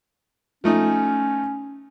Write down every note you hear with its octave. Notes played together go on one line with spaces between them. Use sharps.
F3 A3 C#4 D#4